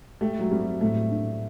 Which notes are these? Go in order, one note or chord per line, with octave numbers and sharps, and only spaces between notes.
A3 G4
F#3
G3 C4
A2 A3
D4